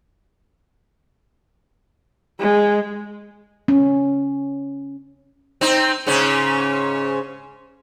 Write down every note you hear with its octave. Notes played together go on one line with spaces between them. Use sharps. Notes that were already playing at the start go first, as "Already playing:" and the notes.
G#3
C#4
C4 D#4
G#2 C#3 C#4